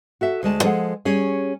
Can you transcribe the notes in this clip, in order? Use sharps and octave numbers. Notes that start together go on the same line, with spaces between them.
F#4 A4 E5
D2 G#3 A5
F3 G#3 G#4 A4 F#5
G3 C#4 G#4 C#5